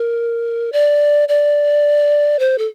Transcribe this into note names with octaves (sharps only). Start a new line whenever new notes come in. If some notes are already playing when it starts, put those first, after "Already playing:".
Already playing: A#4
D5
D5
C5
A4